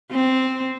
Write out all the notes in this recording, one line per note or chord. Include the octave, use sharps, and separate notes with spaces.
C4